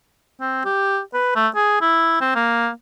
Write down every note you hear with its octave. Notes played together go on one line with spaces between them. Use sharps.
C4
G4
B4
A3
G#4
E4
C4
A#3